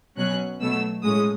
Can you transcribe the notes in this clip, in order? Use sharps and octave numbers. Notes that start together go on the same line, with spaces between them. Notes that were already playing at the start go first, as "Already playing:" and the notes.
B2 F#3 C#4 F#6
B2 F#3 A3 E6
A2 G#3 C#4 D#6